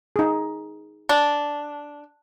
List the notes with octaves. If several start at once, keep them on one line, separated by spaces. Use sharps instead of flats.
D#4 G#4
D4